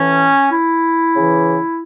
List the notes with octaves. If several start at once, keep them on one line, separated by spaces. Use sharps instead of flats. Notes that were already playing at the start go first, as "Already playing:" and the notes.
Already playing: A2 E3 C#4
E4
C#3 E3